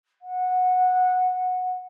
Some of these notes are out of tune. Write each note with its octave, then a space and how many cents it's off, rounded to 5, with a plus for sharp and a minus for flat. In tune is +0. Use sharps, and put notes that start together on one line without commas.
F#5 -15